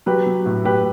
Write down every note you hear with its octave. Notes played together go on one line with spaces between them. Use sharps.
F#3 G4 B4
F#3
A2
A2 G4 B4